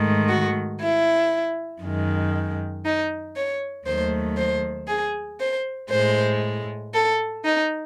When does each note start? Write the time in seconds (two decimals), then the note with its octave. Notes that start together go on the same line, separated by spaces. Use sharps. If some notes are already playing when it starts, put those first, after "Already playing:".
Already playing: G#2 D#3 A3
0.29 F#4
0.81 E4
1.82 F#2 D#3 G#3
2.85 D#4
3.36 C#5
3.87 D#2 D#3 F#3 A3 C5
4.37 C5
4.88 G#4
5.40 C5
5.90 A2 G#3 C5
6.94 A4
7.45 D#4